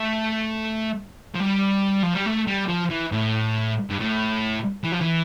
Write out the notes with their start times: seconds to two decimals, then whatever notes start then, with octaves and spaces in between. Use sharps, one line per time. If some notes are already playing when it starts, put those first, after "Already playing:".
Already playing: A3
1.35 F3
1.40 G3
2.03 F3
2.14 G3
2.26 A3
2.47 G3
2.69 F3
2.90 E3
3.12 A2
3.90 G2
3.98 A2
4.84 E3
4.92 F3
5.01 E3